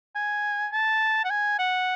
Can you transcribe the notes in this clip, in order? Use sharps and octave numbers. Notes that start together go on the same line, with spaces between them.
G#5
A5
F#5
G#5
F#5